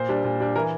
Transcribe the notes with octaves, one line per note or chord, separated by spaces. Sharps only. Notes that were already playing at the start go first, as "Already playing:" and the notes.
Already playing: A#2 C5
G3 D4
A#2
G3 D4
E3 A#4